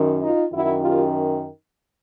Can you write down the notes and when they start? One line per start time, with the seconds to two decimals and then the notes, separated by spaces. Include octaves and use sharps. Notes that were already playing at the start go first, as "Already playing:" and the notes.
Already playing: F#2 D#3
0.22 D#4 F4
0.52 F#2 D#3 E4 F#4
0.82 F4 G4